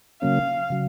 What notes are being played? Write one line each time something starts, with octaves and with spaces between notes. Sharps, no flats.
C#3 F#3 A#3 C#4 F5
C#3 F#3